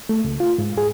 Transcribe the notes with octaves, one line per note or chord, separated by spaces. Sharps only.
A3
C#2
F4
G#2
G#4